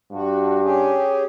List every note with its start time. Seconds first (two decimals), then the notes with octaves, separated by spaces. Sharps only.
0.12 G2 F#4
0.63 C#4 G4 G#4